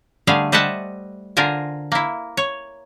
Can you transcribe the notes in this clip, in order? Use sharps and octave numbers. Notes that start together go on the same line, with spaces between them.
D3 G3 A3 G#4 F5
G3 C5 D#5 E5 F#5 A5
D3 F4 A#4 C5 G#5
A#3 E4
C#5